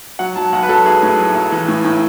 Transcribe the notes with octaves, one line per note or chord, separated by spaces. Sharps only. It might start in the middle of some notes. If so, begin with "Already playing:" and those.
F#3 F#5
F#3 A5
B1 F#5
B4
F#3 A4
B1 G#4
A2
F#3
B1
E3
A2
A2